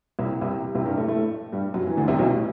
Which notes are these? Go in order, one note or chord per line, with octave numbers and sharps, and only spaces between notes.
C2 C3
C2 C3
C2 C3
G2 G3
A2 A3
A2 A3
G2 G3
F#2 F#3
E3
D2 D3
C2 C3
B1 B2
A2